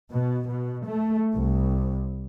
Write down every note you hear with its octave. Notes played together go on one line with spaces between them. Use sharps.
B2
B2
A3
C2